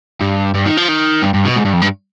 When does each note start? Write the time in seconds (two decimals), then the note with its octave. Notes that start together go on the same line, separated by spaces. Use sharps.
0.21 G2
0.54 G2
0.66 D#3
0.77 F3
0.88 D#3
1.23 G2
1.34 G2
1.45 B2
1.56 G#2
1.65 G2
1.73 F2
1.81 G2